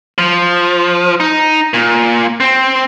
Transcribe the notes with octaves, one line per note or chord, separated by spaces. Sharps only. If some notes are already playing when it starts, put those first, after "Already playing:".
F3
D#4
A#2
C4